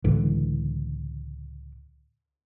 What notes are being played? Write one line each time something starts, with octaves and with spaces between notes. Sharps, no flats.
C#2 A2 D3 E3